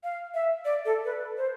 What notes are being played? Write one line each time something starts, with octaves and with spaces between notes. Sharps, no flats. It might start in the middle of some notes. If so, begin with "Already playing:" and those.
F5
E5
D5
A4
B4
C5